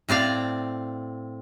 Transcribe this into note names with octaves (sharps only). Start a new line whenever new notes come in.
A2 C4 D5 F5